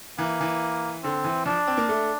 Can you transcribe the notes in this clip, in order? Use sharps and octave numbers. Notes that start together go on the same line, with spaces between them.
E3 A#3
E3
D3 C4
E3
F3 D4
C4
A#3
A3